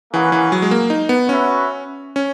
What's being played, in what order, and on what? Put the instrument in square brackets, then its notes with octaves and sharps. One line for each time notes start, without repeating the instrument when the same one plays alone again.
[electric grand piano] E3 [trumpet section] A#3 C#4 G#4 B4 F#5
[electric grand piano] E3
F#3
G#3
A#3
D#4
B3
[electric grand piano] C#4 [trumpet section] F#4 B4 E5
[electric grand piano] C#4